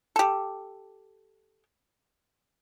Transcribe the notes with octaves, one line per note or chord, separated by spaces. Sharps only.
G4 A4